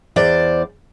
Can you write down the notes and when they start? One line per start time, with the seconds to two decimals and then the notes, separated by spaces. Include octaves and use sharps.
0.16 E2 C5 D5